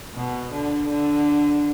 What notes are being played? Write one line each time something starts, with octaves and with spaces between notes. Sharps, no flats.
B2
D3
D3